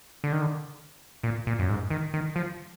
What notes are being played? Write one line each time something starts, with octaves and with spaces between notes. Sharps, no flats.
D3
D#3
D3
A#2
A#2
F#2
G#2
D#3
D#3
F3